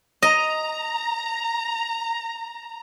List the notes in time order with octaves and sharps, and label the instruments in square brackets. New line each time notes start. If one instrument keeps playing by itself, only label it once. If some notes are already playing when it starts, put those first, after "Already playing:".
[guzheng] D#5 [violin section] A#5